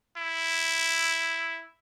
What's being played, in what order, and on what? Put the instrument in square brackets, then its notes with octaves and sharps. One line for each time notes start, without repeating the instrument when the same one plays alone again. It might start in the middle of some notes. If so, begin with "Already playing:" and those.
[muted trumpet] E4